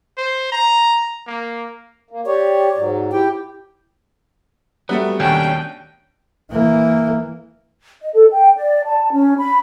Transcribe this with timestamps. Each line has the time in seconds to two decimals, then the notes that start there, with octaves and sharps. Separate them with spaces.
0.17 C5
0.52 A#5
1.27 A#3
2.11 A#3
2.26 G4 C#5 D5
2.77 G#2 F#3
3.12 E4 G4 G5
4.89 F#3 G3 A3 B3
5.20 D#2 B2 C#4 D4 G5
6.51 E3 A#3
8.01 D#5
8.14 A4
8.31 G5
8.57 D5
8.86 A5
9.12 C#4
9.38 B5